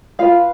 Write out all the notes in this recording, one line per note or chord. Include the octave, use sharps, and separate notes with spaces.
F4 B4 F5